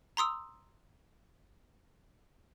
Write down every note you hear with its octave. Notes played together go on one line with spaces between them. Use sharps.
A#5 C6 D#6 E6